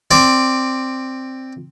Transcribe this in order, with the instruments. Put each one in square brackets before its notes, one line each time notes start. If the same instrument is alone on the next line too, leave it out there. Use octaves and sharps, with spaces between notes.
[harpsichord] C4 D5